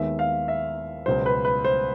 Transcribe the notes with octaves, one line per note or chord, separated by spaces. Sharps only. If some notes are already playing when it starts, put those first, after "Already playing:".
Already playing: D#2 D#3 G#3 B3 E5
F5
E5
C#2 B2 F#3 C5
B4
B4
C5